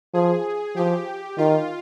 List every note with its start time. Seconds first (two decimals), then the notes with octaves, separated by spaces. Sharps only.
0.14 F3 G#4
0.76 F3 G4
1.38 D#3 F4